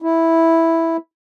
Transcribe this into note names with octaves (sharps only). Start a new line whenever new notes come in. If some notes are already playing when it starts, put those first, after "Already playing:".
E4